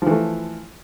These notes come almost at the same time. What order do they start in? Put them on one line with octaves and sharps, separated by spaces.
F3 E3 A3